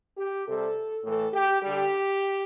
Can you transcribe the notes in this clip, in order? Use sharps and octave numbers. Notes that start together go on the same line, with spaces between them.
G4
C3 G3 A4
A2 E3 A3 A4
G4
D3 G3 G4